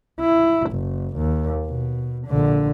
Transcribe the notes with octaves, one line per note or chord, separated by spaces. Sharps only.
E4
F#1
D#2
B2
A#1 D3